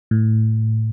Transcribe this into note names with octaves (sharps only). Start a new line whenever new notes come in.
A2